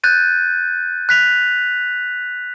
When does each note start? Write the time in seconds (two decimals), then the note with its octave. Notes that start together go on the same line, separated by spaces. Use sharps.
0.04 F#6 G6 A6 D#7
1.09 F#6 B6 F7